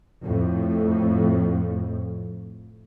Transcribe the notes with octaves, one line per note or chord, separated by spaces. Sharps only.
F2 A2